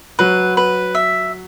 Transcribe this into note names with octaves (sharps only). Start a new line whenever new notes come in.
F#3 B4
B4
E5